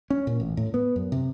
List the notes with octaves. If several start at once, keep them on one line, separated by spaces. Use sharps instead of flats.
C#4
A#2
A1
A2
B3
F#2
C3